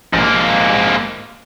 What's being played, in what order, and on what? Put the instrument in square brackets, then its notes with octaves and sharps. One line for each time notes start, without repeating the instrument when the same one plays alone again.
[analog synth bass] A#1 [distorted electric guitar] G#2 A#3